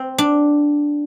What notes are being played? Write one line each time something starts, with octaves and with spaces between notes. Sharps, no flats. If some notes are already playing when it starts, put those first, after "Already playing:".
Already playing: C4
D4